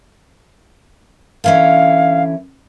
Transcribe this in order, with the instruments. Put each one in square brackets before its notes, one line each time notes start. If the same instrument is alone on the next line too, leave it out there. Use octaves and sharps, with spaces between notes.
[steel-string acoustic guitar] D3 E3 C#4 [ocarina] F5